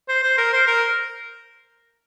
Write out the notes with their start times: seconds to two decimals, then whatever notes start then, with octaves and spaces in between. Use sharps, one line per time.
0.08 C5
0.23 C5
0.38 A#4
0.53 C5
0.67 A#4